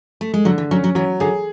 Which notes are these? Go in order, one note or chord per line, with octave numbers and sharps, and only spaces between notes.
A3
G#3
D3 F#3
E3
F#3 C#4
F#3
E3 F#3
D3 G#4